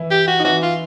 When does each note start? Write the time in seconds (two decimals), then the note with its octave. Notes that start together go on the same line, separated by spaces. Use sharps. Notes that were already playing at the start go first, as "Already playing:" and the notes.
Already playing: E3 E4
0.11 G4
0.28 F#4
0.39 D#4
0.44 E3 E4 F#4
0.63 F4